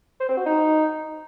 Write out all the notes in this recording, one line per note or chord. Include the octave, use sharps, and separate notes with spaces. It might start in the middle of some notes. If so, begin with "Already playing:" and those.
C5
C4
F#4
D#4